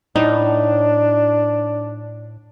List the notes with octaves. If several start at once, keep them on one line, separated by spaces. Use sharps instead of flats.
A2 D4 D#4